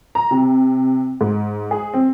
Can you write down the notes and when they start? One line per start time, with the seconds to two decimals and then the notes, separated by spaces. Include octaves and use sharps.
0.15 A#5
0.31 C3
1.21 G#2
1.71 G#4
1.94 C4